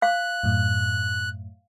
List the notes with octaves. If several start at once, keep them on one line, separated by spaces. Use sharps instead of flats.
F5 F#6
F#2 A2